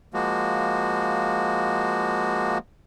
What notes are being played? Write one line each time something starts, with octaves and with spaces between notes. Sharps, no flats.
F3 G#3 A#3 F#4